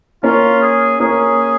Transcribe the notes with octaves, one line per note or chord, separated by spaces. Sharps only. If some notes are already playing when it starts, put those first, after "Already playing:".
A#3 C#4 F4
G#4
A#3 C#4 G#4